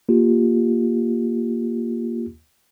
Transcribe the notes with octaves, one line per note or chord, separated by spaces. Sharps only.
A#3 F4 G4